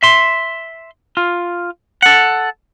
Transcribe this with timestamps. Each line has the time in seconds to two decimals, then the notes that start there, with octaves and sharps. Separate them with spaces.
0.03 E5 C6
1.17 F4
2.02 A4 F#5